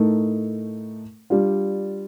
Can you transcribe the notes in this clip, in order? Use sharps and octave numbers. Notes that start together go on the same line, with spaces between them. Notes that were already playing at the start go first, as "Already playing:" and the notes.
Already playing: A2 A3 D#4 A#4
G3 D4 F4